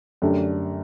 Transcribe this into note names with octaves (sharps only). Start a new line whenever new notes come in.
F#2 D3 A3 D4 G4